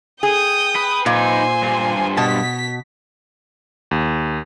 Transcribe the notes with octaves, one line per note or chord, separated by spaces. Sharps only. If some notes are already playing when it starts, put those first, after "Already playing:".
G#4 G5 D#6
B4
A#2 D#4 B4 C5 G#5
G2 F4
B2 A5 B6
D#2